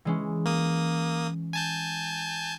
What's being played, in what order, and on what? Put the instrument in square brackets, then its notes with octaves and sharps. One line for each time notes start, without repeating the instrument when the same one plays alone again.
[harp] E3 G#3 C#4
[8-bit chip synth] A#3 D#6
G#5 A5 G6